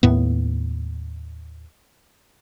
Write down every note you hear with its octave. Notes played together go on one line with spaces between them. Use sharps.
D#2 A2 B3